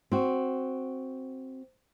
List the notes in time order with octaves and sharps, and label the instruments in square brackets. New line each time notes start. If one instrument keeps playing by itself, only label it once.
[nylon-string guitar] C4 F#4